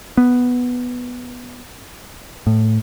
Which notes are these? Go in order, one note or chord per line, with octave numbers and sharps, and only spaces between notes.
B3
A2